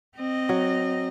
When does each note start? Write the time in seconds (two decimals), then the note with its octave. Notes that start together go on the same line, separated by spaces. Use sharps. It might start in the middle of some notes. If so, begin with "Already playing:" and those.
0.17 C4 D#5
0.49 F#3